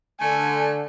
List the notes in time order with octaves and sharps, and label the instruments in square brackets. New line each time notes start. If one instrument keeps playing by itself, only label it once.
[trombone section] D3 [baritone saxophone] A3 [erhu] G#5